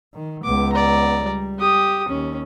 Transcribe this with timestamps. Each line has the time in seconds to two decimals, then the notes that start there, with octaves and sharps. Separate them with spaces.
0.14 D#3
0.44 C#2 B3 D6
0.73 D5 A#5
1.24 G3
1.59 G4 D#6
2.08 D#2 C#4